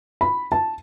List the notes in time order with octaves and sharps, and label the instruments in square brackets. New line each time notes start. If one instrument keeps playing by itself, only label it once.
[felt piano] B5
A5